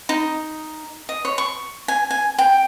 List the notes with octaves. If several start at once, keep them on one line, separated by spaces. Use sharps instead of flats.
D#4
D#5
C#5
C#6
G#5
G#5
G5